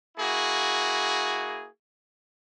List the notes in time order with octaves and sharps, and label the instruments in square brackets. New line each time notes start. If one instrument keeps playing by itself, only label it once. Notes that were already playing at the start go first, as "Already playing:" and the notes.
[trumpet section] A#3 E4 F#4 G#4